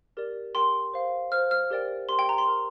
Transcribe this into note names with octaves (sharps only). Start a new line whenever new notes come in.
G4 A#4 D5
G4 A#4 G5 C6
C5 F5
C5 F5 F6
F6
G4 A#4 D5 G5
G4 A#4 G5 C6
G5
A#5
C6
A#4 G5